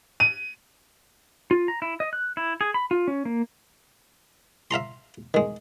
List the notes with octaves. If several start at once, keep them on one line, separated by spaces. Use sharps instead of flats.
D#7
F4
A#5
E4
D#5
F#6
E4
G#4
B5
F4
C#4
A#3
E5 F5 A#5 C6
D#3 G#3